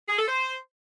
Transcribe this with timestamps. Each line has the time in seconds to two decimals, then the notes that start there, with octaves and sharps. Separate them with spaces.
0.09 G#4
0.19 A4
0.28 C5